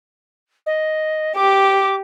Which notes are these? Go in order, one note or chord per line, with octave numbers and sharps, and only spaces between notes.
D#5
G4 D6